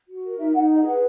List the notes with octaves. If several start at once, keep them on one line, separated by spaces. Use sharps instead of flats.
F#4
A#4
D#4 E5
D#4 F#5
G#4 D#5
B4 F#5